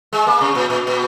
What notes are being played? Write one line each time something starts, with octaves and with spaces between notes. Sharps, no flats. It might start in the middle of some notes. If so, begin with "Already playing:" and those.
G#3
A#3
C3
A#2
A#2
A#2